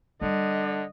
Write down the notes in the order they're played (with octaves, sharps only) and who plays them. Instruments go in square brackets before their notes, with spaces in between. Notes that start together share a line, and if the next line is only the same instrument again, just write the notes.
[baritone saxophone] D3 [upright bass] G3 [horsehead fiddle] D#5